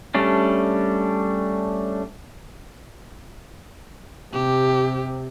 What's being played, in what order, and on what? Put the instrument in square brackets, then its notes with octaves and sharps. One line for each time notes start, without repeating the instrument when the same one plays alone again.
[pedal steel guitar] G3 A3 C#4 D4
[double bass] C3 [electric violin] G4